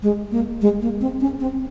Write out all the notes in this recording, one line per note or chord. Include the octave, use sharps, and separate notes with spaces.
G#3
A#3
G#3
A#3
C4
C#4
C4